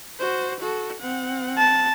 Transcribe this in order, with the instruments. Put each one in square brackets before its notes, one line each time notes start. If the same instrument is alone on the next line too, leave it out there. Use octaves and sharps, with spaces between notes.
[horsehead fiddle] F#4 C5
F#4 A4
C4 F#5
[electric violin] A5